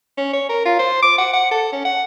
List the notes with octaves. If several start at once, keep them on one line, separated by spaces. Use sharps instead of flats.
C#4
C#5
A#4
F4
C5
D6
F#5
F#5
A4
C#4
F#5